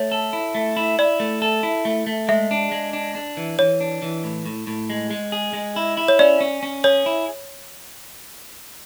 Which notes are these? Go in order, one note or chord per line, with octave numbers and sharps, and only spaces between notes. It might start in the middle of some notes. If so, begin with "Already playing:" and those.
Already playing: A3 C#5
A4
E4
A3
E4
E4 D5
A3
A4
E4
A3
A3
G#3 E5
D4
G#3
D4
D4
E3
E3 C#5
D4
E3
A2
A2
A2
G#3
G#3
G#4
G#3
E4
E4
C#5
C#4 D5
C#4
C#4
G#4 C#5
E4